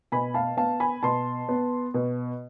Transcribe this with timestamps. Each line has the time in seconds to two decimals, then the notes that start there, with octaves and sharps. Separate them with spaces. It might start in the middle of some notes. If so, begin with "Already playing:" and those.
0.12 B2 G#5 B5
0.34 F5 A5
0.57 B3 F5 A5
0.80 G#5 B5
1.03 B2 A5 C6
1.49 B3
1.94 B2